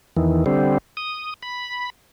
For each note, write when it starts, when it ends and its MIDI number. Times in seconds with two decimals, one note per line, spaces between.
0.17 0.44 40
0.17 0.44 51
0.17 0.44 52
0.46 0.78 50
0.46 0.78 55
0.46 0.78 60
0.97 1.34 87
1.43 1.90 83